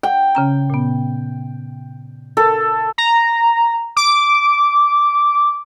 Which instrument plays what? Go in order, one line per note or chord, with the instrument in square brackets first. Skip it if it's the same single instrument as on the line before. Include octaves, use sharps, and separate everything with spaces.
[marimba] F#5 [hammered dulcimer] G5
[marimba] C#3 C#4 A#5
A#2 B3
[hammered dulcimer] A4 [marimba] A#4
[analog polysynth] A#5
D6